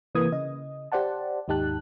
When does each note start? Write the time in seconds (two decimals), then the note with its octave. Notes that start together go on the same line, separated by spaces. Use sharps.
0.15 C3 E3 A#3 B4 D#6 G#6
0.32 C#3 D#5
0.92 G4 C5 D5 F#5 A5
1.48 D#2 G#2 D#4 G4 A5 F#6